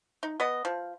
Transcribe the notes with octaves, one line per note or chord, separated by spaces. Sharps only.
D#4
B3 D#5
F3